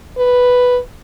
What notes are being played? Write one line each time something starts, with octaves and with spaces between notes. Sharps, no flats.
B4